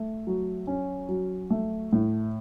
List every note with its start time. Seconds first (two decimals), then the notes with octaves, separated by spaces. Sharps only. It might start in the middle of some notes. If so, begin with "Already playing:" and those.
Already playing: A3
0.27 F#3
0.67 C#4
1.09 F#3
1.50 A3
1.93 A2